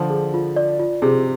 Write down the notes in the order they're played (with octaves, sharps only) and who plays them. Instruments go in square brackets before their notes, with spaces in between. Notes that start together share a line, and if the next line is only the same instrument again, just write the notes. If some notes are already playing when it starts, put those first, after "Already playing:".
Already playing: [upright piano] D3 F3 [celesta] F4
[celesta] G#4
F4
D5
F4
[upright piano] C3 [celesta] G#4